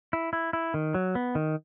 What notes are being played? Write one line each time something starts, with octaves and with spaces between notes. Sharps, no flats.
E4
E4
E4
D#3
F#3
B3
D#3